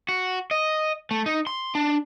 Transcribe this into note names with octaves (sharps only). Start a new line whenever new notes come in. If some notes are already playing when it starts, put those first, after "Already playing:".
F#4
D#5
A3
D#4
C6
D4